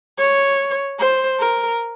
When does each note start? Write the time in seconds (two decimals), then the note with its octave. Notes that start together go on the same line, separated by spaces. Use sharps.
0.18 C#5
0.99 C5
1.40 A#4